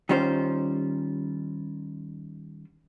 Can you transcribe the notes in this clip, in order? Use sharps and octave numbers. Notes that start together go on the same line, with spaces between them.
D#3 G3 C#4 F4 C5